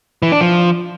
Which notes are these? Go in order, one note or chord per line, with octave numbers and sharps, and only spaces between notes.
E3
D4
F3